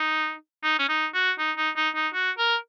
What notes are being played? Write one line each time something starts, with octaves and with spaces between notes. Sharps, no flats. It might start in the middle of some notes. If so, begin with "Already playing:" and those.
Already playing: D#4
D#4
C#4
D#4
F#4
D#4
D#4
D#4
D#4
F#4
A#4